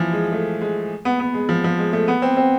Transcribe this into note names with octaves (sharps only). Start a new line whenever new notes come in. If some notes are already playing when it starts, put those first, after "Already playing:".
Already playing: E3 F3
G#3
A3
G#3
B3
B3
G#3
F3
F3
G#3
A3
B3
C4
C4